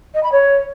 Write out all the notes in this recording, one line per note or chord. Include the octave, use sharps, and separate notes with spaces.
D#5
B5
C#5